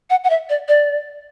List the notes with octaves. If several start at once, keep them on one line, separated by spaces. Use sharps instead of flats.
F#5
F#5
E5
D5
D5